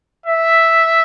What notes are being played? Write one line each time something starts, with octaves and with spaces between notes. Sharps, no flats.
E5